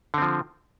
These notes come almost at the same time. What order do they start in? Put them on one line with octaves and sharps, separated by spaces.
D3 C4 F3